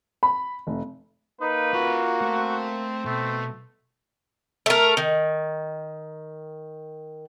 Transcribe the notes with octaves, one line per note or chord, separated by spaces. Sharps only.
B5
F1
A#3 D#4 B4
F4 F#4 E5
A3 C4
B2 A3
A3 A#4
D#3